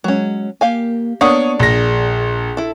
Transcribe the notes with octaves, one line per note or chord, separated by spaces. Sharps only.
F#3 G#3 C#4
A#3 G4 F5 G#5
A#3 B3 D4 C#5 F#5 D#6
A#1 G#4 A#6
E4 A4